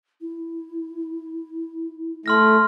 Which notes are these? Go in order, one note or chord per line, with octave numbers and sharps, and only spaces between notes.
E4
A3 C6 F6 A#6